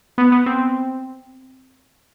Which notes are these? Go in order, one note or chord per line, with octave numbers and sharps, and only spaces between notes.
B3
B3
C4